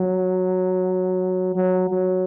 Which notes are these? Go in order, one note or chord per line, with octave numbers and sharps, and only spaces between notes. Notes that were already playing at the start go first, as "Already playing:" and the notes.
Already playing: F#3
F#3
F#3